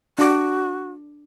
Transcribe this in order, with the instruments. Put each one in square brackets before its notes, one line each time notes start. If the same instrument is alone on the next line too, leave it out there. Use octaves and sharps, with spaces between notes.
[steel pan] D4 D6 [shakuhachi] F#4